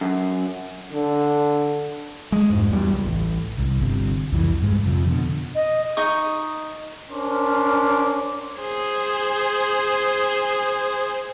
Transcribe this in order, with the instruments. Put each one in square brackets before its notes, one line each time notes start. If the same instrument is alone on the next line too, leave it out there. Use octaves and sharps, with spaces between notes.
[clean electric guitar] F#2
[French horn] D3
[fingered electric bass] G#3
F2 G#2
E2 G3
C#2
A1
[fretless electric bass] C2
G1 C3
C2 F2 E3
D#1 G2 G#3
F2 C3 F3
B2 D3
[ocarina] D#5
[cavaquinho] D#4 D#5 C#6 D#6
[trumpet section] C#4 D4 A#4 C5 C6 D6
[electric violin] G#4 C5